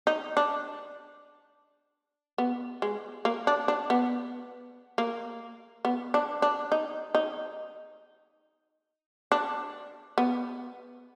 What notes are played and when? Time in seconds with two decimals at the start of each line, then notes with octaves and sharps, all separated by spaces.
0.07 D#4
0.37 D4
2.38 B3
2.82 G#3
3.25 A#3
3.47 D4
3.68 D4
3.90 B3
4.98 A#3
5.85 B3
6.14 D4
6.42 D4
6.72 D#4
7.15 D#4
9.32 D4
10.18 B3